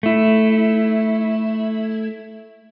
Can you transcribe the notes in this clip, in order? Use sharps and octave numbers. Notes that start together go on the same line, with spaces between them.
A3 E4